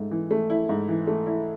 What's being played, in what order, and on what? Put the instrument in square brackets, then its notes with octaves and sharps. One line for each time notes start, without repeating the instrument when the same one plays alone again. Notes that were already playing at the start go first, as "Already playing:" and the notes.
Already playing: [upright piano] G#2 A3
E3
A3
E4
G#2
E3
A3
E4